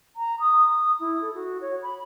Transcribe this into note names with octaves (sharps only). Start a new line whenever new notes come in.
A#5
D#6
E4
A4
F#4
C#5
B5